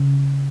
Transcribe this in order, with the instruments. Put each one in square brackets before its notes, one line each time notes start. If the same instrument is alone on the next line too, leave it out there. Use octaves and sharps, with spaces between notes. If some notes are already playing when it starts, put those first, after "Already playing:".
Already playing: [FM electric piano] C#3